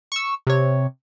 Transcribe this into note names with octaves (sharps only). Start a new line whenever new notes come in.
C#6 E6
C3 C#5